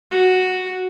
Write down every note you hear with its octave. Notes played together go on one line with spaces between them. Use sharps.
F#4